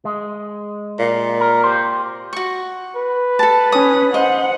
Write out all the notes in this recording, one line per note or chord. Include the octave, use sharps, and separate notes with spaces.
G#3
A#2
A#4
G4 C5
F#4 C#6
B4
A4 A5
C#4 D#6
C5 D#5 F#5